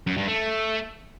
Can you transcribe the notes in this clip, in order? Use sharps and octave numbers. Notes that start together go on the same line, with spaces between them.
F#2
G2
A3